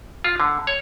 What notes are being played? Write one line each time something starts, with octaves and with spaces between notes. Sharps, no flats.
F4
D3
C#5